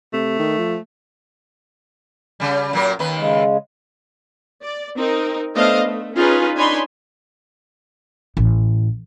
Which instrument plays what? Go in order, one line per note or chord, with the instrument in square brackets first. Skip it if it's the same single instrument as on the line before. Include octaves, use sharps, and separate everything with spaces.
[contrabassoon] C3 [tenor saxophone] A3
[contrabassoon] D#3
F3
[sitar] C#3 G3
A#2 F#3 A#4
D#2 D#3 B4
[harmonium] C#3 G#3
[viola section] D5
C4 D#4 A#4
A3 B3 D4 C5 D#5 F5
A3
C#4 D#4 F4 G#4 B4
D4 D#4 C#5 G#5 B5 C6
[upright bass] A1